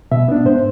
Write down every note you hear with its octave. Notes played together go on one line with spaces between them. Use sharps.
B2 E5
B3 D4
G#2 C5